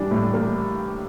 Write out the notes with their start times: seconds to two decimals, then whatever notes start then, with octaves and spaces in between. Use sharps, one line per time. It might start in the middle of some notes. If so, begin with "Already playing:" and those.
Already playing: E3 G3 D4
0.11 A2
0.34 A#3